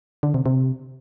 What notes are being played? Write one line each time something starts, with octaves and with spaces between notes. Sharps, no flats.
D3
C3
C3